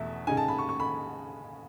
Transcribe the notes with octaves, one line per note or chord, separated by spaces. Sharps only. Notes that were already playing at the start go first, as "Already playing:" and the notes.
Already playing: E2 B2 A3 E5
C#3 G#3 D#4 G#5
A5
B5
C#6
C#6
B5